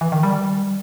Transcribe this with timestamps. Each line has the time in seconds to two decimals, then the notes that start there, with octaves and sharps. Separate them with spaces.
0.01 E3
0.12 D#3
0.23 G3